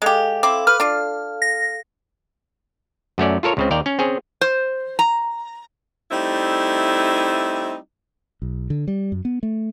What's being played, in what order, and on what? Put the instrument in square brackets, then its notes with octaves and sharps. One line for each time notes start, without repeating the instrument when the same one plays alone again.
[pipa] G#3 G4 [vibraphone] A4 F5
[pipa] C4 E4 [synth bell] D6
[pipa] B4 [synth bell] F6
[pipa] D4 F4
[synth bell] A#6
[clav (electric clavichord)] F#2 A3 C#4 D5
F4 A4 A#4 C#5
C#2 C#3 C4
D#2 A#4 D5 F5 G5
C#4
C4 C#4 G#4
[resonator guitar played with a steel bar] C5
A#5
[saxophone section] G3 A3 C4 D#4 E4
[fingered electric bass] B1
D3
G3
F#2
B3
A3